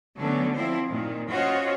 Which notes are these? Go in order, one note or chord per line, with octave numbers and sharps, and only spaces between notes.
D3 F#3 A3 B3 C#4
F3 C4 E4 C5
A#2 D#3
C#4 F4 F#4 C5 C#5 D#5